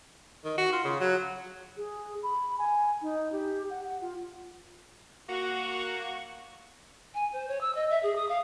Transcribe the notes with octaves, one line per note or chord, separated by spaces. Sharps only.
D#3
F#4
F4
C#3
F#3
G#4
B5
G#5
D#4
G4
F#5
F#5
F4
A#3 F#4
G#5
C5
C#5
E6
D#5
E5
G#4
D#6
F5